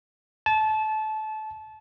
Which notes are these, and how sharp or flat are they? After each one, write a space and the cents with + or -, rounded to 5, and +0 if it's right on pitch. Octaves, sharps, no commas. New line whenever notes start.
A5 -25